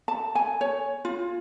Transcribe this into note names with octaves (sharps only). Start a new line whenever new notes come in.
A5
G#5
C#5
F4